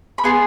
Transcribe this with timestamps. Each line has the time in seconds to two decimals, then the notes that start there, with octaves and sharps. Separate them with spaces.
0.18 B5
0.24 B3 F4 G#4 C6